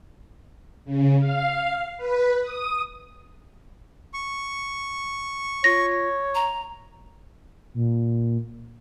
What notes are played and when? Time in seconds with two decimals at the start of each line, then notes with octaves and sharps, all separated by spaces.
0.85 C#3
1.20 F5
1.97 B4
2.42 D#6
4.14 C#6
5.64 F4 C#5 A#6
6.35 A#5
7.74 A#2